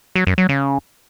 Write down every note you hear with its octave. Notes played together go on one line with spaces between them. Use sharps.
F#3
F#2
F#3
C#3